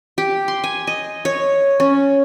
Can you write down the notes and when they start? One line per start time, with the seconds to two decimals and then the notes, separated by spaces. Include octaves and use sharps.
0.18 G4
0.48 C6
0.64 G#5
0.87 D#5
1.25 C#5
1.80 C#4